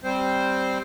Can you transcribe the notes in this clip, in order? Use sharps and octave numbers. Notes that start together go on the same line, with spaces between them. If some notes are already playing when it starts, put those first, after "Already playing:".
G3 C4 C5